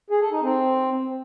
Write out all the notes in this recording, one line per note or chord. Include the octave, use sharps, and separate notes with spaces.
G#4
A4
D#4
C4